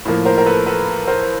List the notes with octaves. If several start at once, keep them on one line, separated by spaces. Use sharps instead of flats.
A2 F3 A#3
A#4 C5
A#4
A4 B4
A4 B4
A#4 C5